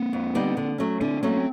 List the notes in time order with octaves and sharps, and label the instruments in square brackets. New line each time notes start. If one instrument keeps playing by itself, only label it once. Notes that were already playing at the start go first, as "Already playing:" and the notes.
Already playing: [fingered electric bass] A#3 C4
[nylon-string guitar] F2
D3 G3 B3 D#4
D3
F#3 A3 C#4
[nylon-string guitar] D3 [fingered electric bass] C4 D4
[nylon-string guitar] F#3 A3 C#4 [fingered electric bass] A#3 C4
[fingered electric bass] C4